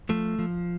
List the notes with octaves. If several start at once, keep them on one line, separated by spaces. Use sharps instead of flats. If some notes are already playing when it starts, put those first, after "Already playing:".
F3 A3
F3